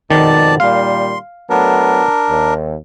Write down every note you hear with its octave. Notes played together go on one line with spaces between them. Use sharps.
F2 G#2 B2 D#3 D5 A5
A#2 D#3 G3 F5 C6
F#3 A3 B3 D4 A#4
D#2